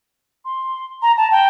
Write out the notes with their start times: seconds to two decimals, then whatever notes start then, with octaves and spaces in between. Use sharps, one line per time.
0.45 C6
1.02 A#5
1.17 A5
1.31 G5